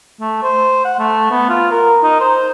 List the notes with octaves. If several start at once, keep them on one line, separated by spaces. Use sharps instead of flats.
A3
C5
F#5
A3
B3
F4
A#4
D#4
C5